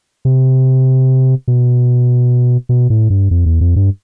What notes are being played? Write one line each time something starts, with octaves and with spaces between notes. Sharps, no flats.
C3
B2
B2
A2
G2
F2
E2
F2
G2